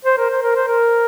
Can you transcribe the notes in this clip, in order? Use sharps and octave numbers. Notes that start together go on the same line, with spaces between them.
C5
A#4
C5
A#4
C5
A#4